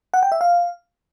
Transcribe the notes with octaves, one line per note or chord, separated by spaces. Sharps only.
F#5
G5
E5
F5